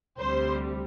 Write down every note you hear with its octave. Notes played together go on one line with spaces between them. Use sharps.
D2 C3 G3 C5